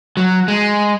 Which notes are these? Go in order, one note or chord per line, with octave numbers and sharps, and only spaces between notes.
F#3
G#3